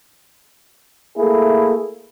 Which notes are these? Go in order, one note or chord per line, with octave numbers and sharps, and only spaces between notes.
A3 A#3 E4 G#4